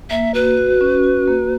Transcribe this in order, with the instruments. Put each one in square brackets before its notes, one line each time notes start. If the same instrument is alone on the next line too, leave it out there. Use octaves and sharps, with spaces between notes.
[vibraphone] A#3 [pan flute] E5
[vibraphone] F#4 [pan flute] B4
[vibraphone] F#4
C#4
F#4
A#3